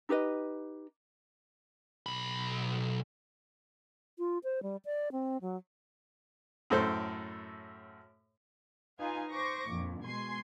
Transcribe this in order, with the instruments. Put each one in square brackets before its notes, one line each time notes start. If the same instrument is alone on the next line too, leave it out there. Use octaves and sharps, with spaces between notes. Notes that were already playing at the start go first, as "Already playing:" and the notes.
[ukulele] D#4 G4 B4 D#5
[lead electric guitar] B1 B5
[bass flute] F4
C5
G3
D5
C4
F#3
[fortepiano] F#2 A2 A4 C5
[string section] D#4 F4 B4 F5 G#5
C5 C#6 D6 A#6
A#1 F2
B2 G#3 G#5 C6 G#6 C7